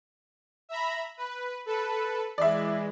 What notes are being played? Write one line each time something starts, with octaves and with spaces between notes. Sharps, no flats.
E5 A#5 B5
B4
A4 B4
E3 G#3 D5 E5